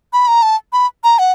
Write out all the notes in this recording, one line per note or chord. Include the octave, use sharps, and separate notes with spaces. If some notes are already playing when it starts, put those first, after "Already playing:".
B5
A#5
A5
B5
A#5
F#5